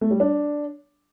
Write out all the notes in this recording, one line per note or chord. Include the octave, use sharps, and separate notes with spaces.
A3
G3
D4